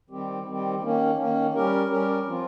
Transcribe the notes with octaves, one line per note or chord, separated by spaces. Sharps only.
D#3 G3 C4 G4
D#3 G3 C4 G4
D#3 A#3 C#4
D#3 A#3 C#4
G3 C#4 G4 A#4
G3 C#4 G4 A#4
F3 C4 F4